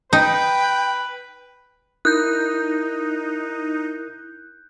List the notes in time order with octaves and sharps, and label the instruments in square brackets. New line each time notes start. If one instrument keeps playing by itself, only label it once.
[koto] D#4 [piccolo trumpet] B4 [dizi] G5
[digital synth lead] D#4 [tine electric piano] E4 A#4 D#6 [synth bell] F#6 G6